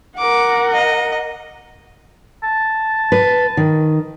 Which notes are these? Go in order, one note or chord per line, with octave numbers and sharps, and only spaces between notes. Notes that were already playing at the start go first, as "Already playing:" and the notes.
A#4 F#5 D6
D#5
A5
B4
D#3